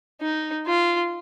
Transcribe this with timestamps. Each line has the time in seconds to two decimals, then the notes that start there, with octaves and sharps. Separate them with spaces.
0.21 D#4
0.67 F4